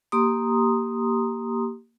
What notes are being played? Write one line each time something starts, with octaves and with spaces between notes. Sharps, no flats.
A#3 G4 A#5 C6 D#6